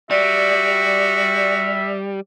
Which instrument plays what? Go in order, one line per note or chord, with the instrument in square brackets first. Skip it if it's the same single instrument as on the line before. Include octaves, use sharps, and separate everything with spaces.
[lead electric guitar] G3 [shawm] F#4 [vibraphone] D5 [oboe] E5